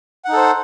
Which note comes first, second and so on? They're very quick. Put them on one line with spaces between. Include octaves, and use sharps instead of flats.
F#5 D#4 A4 C5